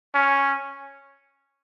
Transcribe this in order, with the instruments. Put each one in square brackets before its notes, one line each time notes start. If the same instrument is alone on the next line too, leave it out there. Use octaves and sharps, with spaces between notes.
[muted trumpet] C#4